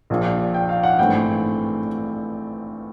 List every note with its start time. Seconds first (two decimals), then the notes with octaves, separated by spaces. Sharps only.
0.10 A#1 A#2 F3
0.54 G5
0.69 F5
0.83 F#5
0.98 G#1 G2 E3 A3 C4 G5